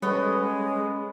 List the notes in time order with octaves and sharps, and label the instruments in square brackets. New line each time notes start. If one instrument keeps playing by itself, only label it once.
[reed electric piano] G3 A4 [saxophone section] G#3 C#4 [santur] B3 [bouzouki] C#5 D#5